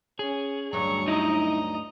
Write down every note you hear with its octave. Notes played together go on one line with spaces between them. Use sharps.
C#4 G#4
D2 G2 F#3 A#5 C#6
D#4 E4 D#5 A#5